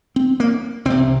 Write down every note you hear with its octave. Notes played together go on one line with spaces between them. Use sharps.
C4
A#3
C2 C4
C3